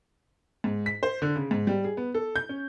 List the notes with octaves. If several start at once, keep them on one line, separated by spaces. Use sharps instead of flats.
G#2
B6
C5
D3
C#3
G#2
G3
G#4
B3
A4
G6
C#4